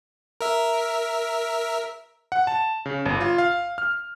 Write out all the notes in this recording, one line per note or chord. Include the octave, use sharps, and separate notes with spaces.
A#4 E5
F#5
A5
C#3
G1
F4
F5
F6